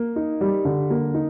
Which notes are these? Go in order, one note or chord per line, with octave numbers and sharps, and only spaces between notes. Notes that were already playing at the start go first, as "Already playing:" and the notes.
Already playing: A#3
D#4
G3
D3
A#3
D#4